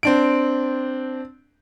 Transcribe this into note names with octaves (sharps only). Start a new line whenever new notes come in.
C4 D4 D7